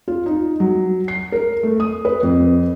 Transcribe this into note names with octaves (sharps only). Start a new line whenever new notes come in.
F4
D#4
F#3
C7
A#4
A3
D#6
B4
F2